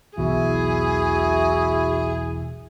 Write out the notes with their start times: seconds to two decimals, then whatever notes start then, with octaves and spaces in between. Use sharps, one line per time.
0.18 E1 B1 E2 E4 F#4 G#4